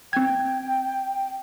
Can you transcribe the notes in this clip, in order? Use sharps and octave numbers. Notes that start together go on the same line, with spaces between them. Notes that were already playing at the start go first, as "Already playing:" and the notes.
C4 G5 G#6